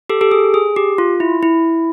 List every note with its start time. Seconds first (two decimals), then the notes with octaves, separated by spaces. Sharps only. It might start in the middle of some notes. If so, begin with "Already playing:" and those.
0.10 G4 A4
0.21 G4 A4
0.32 G#4
0.54 G#4
0.76 G4
0.98 F4
1.20 E4
1.43 E4